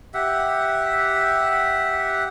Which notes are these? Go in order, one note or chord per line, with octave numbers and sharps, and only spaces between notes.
G4 E5 F#5